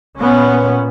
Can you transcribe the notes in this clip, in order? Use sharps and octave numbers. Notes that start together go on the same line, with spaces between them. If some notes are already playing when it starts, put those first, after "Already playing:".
A#2 B3 C#4